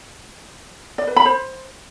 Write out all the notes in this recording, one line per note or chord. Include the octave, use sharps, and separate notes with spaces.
D5
B4
B5
C5